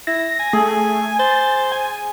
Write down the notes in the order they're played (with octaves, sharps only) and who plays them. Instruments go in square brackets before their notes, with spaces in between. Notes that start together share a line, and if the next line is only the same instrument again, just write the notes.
[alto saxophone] E4 [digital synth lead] A#6
[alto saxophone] G#5
[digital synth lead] A3 [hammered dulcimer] G#4
[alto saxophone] C5 [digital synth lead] A6
[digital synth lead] G#5